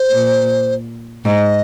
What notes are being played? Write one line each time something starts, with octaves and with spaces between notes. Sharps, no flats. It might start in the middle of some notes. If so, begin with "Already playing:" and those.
Already playing: C5
A#2
G#2 D#5